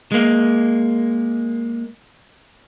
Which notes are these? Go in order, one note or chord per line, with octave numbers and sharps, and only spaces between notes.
G#3 A#3